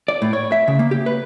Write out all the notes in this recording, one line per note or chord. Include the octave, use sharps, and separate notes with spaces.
D5
A2
C#5
E5
C#3
A#3
G4
B4